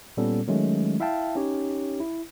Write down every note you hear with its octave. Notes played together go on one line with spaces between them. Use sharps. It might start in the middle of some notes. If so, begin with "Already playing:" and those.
A#2 G3 B3 C#4 A4
D#3 F#3 G#3 A3 C#4
E4 E5 F5 G5 A5
C#4 D#4 G4 C#5
E4